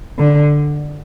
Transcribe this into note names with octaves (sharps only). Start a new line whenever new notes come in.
D3